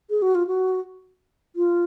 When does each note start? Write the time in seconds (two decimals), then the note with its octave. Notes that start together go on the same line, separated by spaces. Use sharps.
0.10 G#4
0.22 F#4
0.35 F4
0.47 F#4
1.56 F4